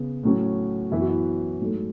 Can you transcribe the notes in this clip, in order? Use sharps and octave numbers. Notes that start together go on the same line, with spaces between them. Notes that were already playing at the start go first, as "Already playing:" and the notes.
Already playing: C#3 B3
A2 F#3 C#4
F#2 E3 B3 E4
F#4
E4
G#2 F#3 A3